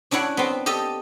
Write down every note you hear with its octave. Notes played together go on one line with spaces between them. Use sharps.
C#4 D4 E4 C#5 F#5
B3 C4
G4 A4 D#5